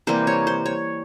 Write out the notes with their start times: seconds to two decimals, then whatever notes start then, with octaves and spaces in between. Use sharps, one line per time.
0.07 C3 E3 G3 A#3 C5
0.27 C#5
0.47 C5
0.66 C#5